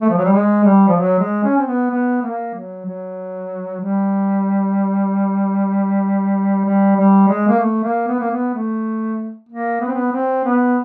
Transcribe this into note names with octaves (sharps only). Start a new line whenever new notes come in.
A3
F3
F#3
G3
G#3
G3
F3
F#3
G#3
C#4
C4
B3
B3
A#3
F#3
F#3
G3
G3
G3
G#3
A#3
A3
A#3
B3
A#3
B3
A3
A#3
B3
C4
B3
C4
B3